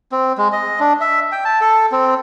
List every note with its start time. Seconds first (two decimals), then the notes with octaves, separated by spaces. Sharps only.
0.12 C4
0.38 G#3
0.52 D#5
0.80 D4
1.01 E5
1.32 G5
1.45 A5
1.61 A4
1.92 C4